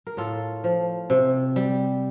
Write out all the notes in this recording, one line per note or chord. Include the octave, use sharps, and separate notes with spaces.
A#4
A2 F4 A4
F3
C3
G3